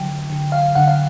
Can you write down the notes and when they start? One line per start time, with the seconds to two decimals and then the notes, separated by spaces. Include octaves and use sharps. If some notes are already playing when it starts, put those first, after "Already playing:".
Already playing: D3 F#3 G5
0.30 D3
0.52 F5
0.75 D3 F#5
0.88 F5